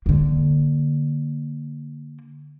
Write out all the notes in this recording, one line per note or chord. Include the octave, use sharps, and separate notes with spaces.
D3 A#3